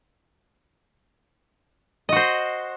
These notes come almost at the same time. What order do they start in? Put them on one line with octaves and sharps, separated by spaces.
D#5 F#4 C5